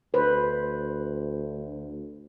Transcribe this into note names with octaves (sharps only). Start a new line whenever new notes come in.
D2 B4 C5